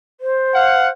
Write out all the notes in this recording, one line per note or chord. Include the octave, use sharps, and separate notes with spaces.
C5
F5 F#5